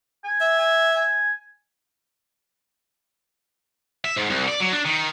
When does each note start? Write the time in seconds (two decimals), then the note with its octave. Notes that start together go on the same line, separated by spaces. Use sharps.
0.24 G#5
0.41 E5
0.59 G#5
0.96 G#5
4.04 E5
4.16 G#2
4.30 C2
4.48 D5
4.60 F#3
4.72 D4
4.85 D#3